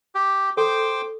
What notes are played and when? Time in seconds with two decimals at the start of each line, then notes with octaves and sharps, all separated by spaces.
0.15 G4
0.57 A4 C5 G5 D6